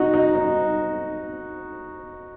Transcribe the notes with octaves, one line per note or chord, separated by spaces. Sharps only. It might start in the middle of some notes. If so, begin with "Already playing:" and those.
Already playing: D#4 F#4
D#4
D#4